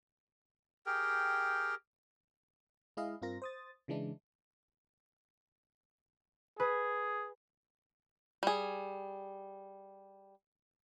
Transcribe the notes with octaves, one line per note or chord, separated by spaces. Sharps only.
G4 G#4 A#4 G5
G#3 E4 G#4 D#5 F5
G2 C4 F4 A#4 A#6
C5 D#6 A6
C#3 E3 G#3 D4 E4
G#4 B4
G3 G#4